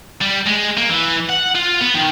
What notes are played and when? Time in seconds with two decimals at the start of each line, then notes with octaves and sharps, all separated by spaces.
0.21 G3
0.47 G#3
0.77 A#3
0.89 E3
1.29 F#5
1.56 F4
1.81 B3
1.95 D#3